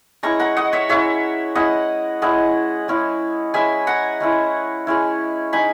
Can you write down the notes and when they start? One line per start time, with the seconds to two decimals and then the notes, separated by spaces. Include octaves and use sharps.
0.23 G#3 C#4 E4 A#5 C#6
0.40 F#5 A#5
0.57 D#5 F#5
0.73 C#5 E5
0.89 G#3 C#4 E4 C#5 E5
1.55 G#3 C#4 E4 D#5 F#5
2.22 G#3 C#4 E4 D#5 F#5
2.88 G#3 C#4 E4
3.54 G#3 C#4 E4 E5 G#5
3.87 F#5 A#5
4.20 G#3 C#4 E4
4.87 G#3 C#4 E4
5.53 G#3 D#4 G#5 B5